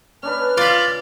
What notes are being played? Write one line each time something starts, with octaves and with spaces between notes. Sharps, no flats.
C#4 D4 B4 F6
F4 D5 B5